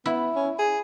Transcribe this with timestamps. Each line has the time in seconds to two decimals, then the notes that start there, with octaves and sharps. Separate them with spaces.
0.06 B3 E4
0.36 C#4
0.59 G#4